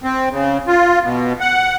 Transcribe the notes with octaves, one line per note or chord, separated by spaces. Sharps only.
C4
C#3
F4
B2
F#5